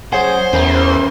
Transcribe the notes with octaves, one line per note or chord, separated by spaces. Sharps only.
F#2 G#4 C5 C#5 F#5 G#5
E2 C#4 A#4 B4